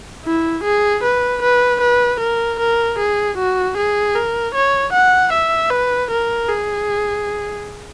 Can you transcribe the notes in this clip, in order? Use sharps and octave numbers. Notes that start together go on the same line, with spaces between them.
E4
G#4
B4
B4
B4
A#4
A#4
G#4
F#4
G#4
A#4
C#5
F#5
E5
B4
A#4
G#4